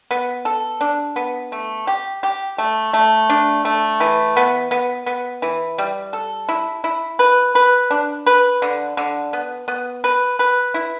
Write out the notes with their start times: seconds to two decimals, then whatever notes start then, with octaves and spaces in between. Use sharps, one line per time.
0.11 B3
0.45 A4
0.81 D4
1.16 B3
1.52 A3
1.87 G4
2.23 G4
2.58 A3
2.93 A3
3.29 D4
3.65 A3
4.00 E3
4.36 B3
4.71 B3
5.06 B3
5.42 E3
5.78 G3
6.13 A4
6.49 E4
6.84 E4
7.19 B4
7.55 B4
7.91 D4
8.26 B4
8.62 D3
8.97 D3
9.33 B3
9.68 B3
10.04 B4
10.39 B4
10.74 E4